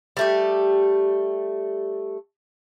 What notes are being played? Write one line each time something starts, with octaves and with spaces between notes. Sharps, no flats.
G3 A3 G4